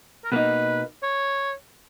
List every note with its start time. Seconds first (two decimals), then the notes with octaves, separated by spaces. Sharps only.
0.24 A#4
0.32 B2 A#3 D#4 B4
1.03 C#5